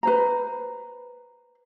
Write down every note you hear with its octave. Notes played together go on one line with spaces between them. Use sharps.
B4 C5 A#5